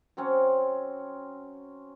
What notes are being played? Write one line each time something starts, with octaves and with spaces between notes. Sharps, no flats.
F#3 C4 C#4